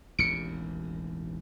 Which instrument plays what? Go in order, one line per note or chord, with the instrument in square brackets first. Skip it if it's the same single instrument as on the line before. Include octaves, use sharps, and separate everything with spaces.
[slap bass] E1 A1 D#2 [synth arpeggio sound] C#7 D7